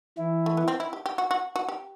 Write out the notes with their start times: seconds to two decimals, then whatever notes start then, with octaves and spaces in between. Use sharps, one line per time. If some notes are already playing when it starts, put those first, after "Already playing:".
0.18 E3 E4
0.46 A3
0.57 B3
0.68 C4
0.80 E4
0.93 G4
1.06 G4
1.18 F#4
1.31 F#4
1.56 F#4
1.68 G4